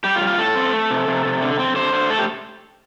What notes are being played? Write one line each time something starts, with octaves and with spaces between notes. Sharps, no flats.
G3 G4
F4
G3
F4
A2 A4
C4
A3
C3
C3
C3
D3
C4
D3 C5
D3
A3 A4
G4